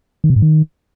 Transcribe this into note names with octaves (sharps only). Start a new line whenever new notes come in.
D#3
C3
G#2
D#3